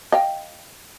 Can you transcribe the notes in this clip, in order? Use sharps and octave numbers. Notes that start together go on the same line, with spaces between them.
D#5 F5 G5